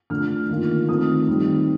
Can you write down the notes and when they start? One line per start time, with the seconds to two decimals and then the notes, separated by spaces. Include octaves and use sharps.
0.10 D3 A3 D4 F4 F6
0.49 D#3 A#3 F4
0.89 D#3 A3 C4 F4 D#6
1.28 D#3 G3 C4